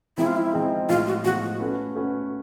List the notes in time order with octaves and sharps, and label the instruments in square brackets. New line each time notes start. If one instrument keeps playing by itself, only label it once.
[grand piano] F3 G#3 C4 D#4 G#4 [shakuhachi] E4
[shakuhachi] F4
E4
[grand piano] F3 G#3 C4 D#4 G#4
[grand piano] A2 F3 G#3 [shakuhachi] F4
[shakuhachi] F#4
[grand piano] A2 F3 G#3 [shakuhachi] F#4
[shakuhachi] F#4
[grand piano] A3 C#4 F#4 B4
A3 C#4 F#4 B4